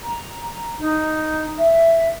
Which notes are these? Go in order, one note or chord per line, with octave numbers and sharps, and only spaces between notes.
A#5
D#4
E5